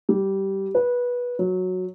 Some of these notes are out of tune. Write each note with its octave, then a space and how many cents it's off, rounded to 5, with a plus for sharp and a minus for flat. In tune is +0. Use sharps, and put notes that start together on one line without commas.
G3 -15
B4 -15
F#3 -10